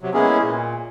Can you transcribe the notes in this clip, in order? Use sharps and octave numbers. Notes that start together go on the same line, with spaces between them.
C3 F#3
G#3 A#3 B3 C#4 E4 G#4
A#2